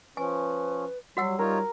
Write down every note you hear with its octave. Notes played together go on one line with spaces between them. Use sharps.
F3 C#4 B4 G#5
F#3 G3 F#4 F#5 E6
D#4 F4 A#4 C#5